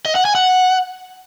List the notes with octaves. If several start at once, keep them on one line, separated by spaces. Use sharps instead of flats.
D#5
F#5
G#5
F#5